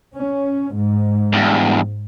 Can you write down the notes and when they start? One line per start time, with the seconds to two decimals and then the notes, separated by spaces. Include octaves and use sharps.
0.15 C#4
0.73 G#2
1.33 E2 G2